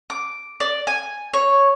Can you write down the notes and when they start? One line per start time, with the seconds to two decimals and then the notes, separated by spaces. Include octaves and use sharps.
0.10 D6
0.60 D5
0.87 G#5
1.34 C#5